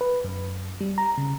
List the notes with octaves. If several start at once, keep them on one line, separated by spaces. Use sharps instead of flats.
B4
F#2
G3
A#5
C#3